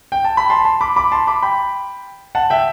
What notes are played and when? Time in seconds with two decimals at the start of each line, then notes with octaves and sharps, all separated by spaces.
0.12 G5
0.25 A5
0.37 B5
0.50 A5 C6
0.65 A5 C6
0.81 B5 D6
0.96 B5 D6
1.12 A5 C6
1.27 B5 D6
1.42 G5 B5
2.35 F#5 A5
2.50 E5 G5